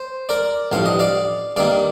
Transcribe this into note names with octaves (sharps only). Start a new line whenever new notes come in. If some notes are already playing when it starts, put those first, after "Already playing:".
Already playing: C5
A#4 D5
A1 G2 F3 F5
D#5
D5 F5
G2 D#3 A#3 D5 F5